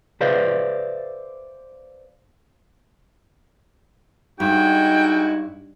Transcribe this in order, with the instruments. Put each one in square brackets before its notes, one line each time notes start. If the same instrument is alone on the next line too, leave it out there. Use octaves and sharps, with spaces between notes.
[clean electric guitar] G#4 B4 C5 D5 E5 F5
[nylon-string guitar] G2 [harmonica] G#3 E4 F#4 [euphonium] D#4 [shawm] G5